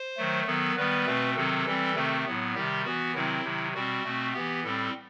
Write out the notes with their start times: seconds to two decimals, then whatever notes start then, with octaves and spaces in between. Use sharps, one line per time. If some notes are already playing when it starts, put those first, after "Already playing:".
Already playing: C5
0.17 D#3 F#3 A3
0.46 D#3 F#3 B3 A4
0.76 D#3 G3 B3 B4
1.06 B2 A3 C4
1.36 C3 D#3 F#3 C4 A4
1.65 E3 G3 C4
1.95 C3 D#3 A3 C4
2.24 A2 F#3 B3
2.55 C3 D#3 G3 G4
2.84 E3 B3 F#4
3.14 C3 D#3 F#3 C4 E4
3.44 C3 D#3 F#3
3.74 B2 G3 C4 F#4
4.03 B2 A3 C4
4.34 E3 B3 G4
4.63 A2 G3 C4 A4